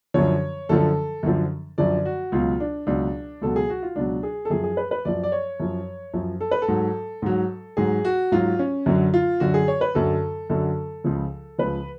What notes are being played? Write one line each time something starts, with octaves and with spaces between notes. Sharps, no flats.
F#2 D3 F3 C#5
F#2 D3 F3 A4
F#2 D3 F3
F#2 D3 F3 D5
F#4
C#2 B2 F#3 F4
D4
C#2 B2 F#3 D4
C#2 B2 F#3 A4
G#4
F#4
F4
C#2 B2 F#3 D4
G#4
A4
F#2 F3 G#4
G#4
B4
B4
F#2 F3 D5
D5
C#5
F#2 F3
F#2 F3
A4
B4
A4
G#2 F#3
G#2 F#3
G#2 F#3 G#4
F#4
G#2 F#3 F4
C#4
F#2 D3 F#3
F4
F#2 D3 F#3 F#4
G#4
C#5
B4
F#2 D3 F#3 A4
F#2 D3 F#3 A4
C#2 C#3 F3
C#2 C#3 F3 B4